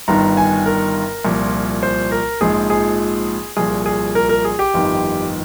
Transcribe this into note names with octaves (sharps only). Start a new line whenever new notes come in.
G1 G2 D#3 A#5
G#5
A#4
C2 A#2 F3
C5
A#4
A#1 G#2 F3 G#4
G#4
C2 A#2 F3 G#4
G#4
A#4
A#4
G#4
G4
G1 F2 D#3